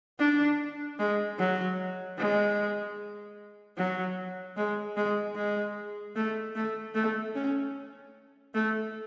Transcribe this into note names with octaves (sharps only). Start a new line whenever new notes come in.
D4
G#3
F#3
G#3
F#3
G#3
G#3
G#3
A3
A3
A3
C#4
A3